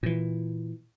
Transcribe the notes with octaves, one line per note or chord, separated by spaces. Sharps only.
A#2 E3